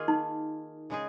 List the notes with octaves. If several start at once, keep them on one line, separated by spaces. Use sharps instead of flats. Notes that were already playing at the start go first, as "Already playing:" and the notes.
Already playing: D#3 A#3 F4 G#4
D#4
C#3 G#3 D#4 G#4